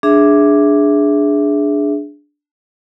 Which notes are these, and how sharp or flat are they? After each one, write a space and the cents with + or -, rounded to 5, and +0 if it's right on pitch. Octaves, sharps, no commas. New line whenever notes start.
D4 +0 G#4 +0 E5 +0